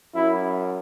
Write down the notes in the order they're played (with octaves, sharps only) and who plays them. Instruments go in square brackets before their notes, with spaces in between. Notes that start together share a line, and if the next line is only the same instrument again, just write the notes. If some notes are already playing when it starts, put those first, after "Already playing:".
[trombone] F#2 [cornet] E4